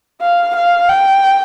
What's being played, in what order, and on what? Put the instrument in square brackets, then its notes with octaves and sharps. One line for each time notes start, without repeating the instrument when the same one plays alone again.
[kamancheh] F5
F5
G5